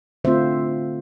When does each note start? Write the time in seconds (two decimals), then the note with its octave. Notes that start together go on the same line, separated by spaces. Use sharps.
0.24 D3 A3 C4 F4 C5 E5